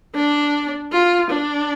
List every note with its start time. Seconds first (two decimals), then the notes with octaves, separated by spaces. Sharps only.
0.15 D4
0.93 F4
1.31 D4